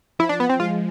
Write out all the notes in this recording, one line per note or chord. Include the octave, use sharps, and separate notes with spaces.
F3 E4
D4
B3
C4
G#3 F4